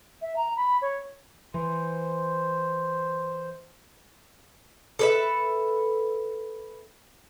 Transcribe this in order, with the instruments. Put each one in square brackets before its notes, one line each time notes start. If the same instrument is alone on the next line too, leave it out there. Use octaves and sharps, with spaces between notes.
[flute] E5
A#5
B5
C#5
[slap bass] E3 [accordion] C5
[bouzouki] A4 B4 E5